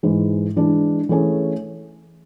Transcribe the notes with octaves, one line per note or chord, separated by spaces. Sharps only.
G#2 E3 G#3
E3 G#3 D4
E3 A3 C#4 G#4